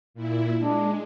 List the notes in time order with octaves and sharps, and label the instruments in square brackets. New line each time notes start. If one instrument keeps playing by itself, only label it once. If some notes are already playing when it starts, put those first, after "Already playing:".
[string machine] A#2 E4
[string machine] G#3 [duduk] D4